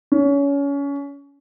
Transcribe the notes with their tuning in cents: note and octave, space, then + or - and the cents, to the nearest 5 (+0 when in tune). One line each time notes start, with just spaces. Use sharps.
C#4 +25